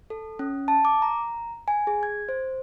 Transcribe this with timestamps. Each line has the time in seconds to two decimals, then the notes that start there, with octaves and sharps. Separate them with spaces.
0.10 A4
0.39 C#4
0.68 A5
0.85 D6
1.02 A#5
1.68 G#5
1.87 G#4
2.03 G#6
2.29 C5